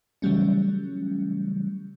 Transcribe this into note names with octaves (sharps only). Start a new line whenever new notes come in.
C#3 E3 F#3 G3 A3 C#4